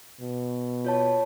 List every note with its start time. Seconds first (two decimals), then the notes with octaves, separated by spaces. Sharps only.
0.21 B2
0.85 F4 C#5 A5